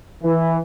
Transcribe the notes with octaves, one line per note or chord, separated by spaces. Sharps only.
E3